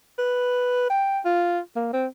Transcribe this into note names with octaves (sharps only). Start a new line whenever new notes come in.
B4
G5
F4
A#3
C4